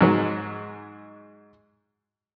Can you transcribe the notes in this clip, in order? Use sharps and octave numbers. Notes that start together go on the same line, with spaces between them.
G#2 F#3 G#3